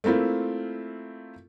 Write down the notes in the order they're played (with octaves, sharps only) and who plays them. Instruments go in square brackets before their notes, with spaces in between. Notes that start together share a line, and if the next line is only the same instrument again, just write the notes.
[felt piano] A3 A#3 C4 E4 F4